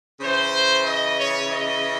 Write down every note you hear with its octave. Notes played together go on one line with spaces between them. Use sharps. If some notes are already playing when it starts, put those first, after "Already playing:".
C#3 E3 C5
D#5
C#5
D#5